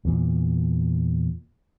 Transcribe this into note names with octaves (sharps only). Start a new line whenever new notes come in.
E2 A#2